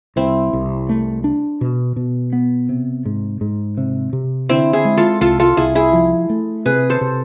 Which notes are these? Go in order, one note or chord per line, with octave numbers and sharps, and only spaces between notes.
C2 C4 E4
C2
A3
D4
B2
B2
B3
C3
G#2
G#2
C3
C3
D3 C4 E4
E4 G#4
G#3
F4 A4
C2 F4 A4
F4 A4
C2 E4 G#4
E4 G#4
F3
A3
C3 G#4 B4
A4 C5
C3